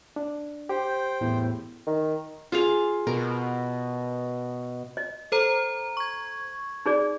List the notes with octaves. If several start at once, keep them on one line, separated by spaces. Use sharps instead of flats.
D4
G4 C5 G5
E2 A2
D#3
F4 G#4 F5
B2 A#4
D#5
A4 C5 A#5
C#6 G#6
D#4 G#4 D5